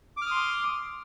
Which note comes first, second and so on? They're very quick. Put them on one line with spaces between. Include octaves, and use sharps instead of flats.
D6 F6 D#6 C6